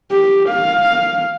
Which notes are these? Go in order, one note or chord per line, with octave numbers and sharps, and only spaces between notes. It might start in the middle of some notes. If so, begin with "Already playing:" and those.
G4
F5